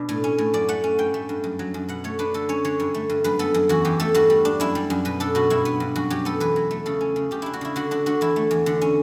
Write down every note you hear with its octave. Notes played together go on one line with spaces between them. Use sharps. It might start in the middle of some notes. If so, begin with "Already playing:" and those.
Already playing: B2 D4
A2
C#4
A2
F#2 D5
A3 F#5
C#4
G2 G5
A3
G2
F#2
F#3
F#2
B2 F#5
A3 C#5
D4 B4
D3 A4
C#4 C#5
D3 C#5
G2
A3
G2
F#2 B4
B3 A4
F#2
E2 F#4
E3 G4
A3 A4
G2 F#4
G3
D4
F#2 E4
G3
F#2
B2 B4
D4 A4
B2 F#4
G2 E4
B3
G2
F#2 F#4
F#3 G4
B3 A4
E2 B4
F#3
A3
C#3 A4
C#4
C#3
C#3 G4
D4 E4
F#4
C#3 E4
D3 F#4
D4 F#4
D3 F#4
E2 E4
A3
E2
D3
C#4